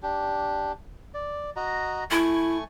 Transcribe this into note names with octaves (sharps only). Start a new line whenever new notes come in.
D4 G4
D5
F#4 D#5 A#5
A3 E4 G#5 C#6